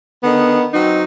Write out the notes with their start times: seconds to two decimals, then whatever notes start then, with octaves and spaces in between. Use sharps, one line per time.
0.23 D3 D#3 B3
0.74 F#3 C4 D#4